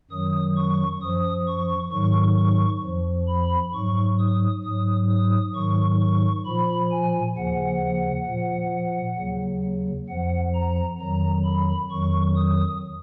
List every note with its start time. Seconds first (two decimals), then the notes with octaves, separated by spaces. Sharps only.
0.10 F#2 D#3 F#3 D#6
0.57 C#6
1.01 F#2 F3 D#6
1.48 C#6
1.92 G#2 D#3 F#3 C#6
2.38 C#6
2.83 F2 F3
3.28 B5
3.74 G#2 F#3 C#6
4.19 D#6
4.64 G#2 F#3 D#6
5.10 D#6
5.55 G#2 D#3 F#3 C#6
6.01 C#6
6.45 A#2 F3 B5
6.91 G#5
7.37 D#2 C#3 F3 F#5
8.28 A#2 F3
9.17 D#2 C#3 F#3
10.08 F2 F3 F#5
10.54 A#5
10.99 F2 D#3 F#3 A#5
11.44 B5
11.90 F2 D#3 F#3 C#6
12.35 D#6